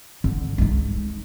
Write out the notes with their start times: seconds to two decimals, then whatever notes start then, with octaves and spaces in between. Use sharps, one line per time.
0.24 D3
0.58 G#3 D#4